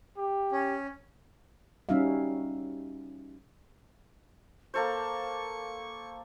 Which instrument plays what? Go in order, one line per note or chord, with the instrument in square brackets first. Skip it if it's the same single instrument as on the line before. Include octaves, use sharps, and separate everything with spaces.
[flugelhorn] G4
[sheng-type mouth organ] C#4
[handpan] G3 C#4 D#4 F#4 E5 F5
[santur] A#3 A4 C5 [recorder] C#6